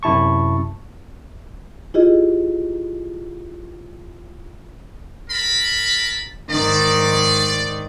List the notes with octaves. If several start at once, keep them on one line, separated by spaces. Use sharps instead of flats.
F#2 C3 E4 A5 C#6
E4 F4 G4 G#4 D#5
A#4 A5 B5
G#2 D#3 D5